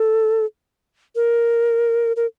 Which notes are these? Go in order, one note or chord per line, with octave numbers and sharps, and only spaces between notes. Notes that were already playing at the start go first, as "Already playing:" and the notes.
Already playing: A4
A#4
A#4